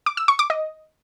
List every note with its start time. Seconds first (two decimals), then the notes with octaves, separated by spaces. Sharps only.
0.06 D6
0.17 E6
0.28 C#6
0.39 D6
0.50 D#5